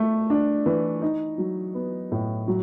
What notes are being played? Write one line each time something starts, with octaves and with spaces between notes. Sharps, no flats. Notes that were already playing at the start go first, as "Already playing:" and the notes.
Already playing: A3
D4
E3
D#4
F#3
B3
A2
F#3